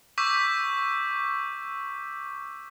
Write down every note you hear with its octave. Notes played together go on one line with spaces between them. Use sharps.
C#6 D6 E6 G6 B6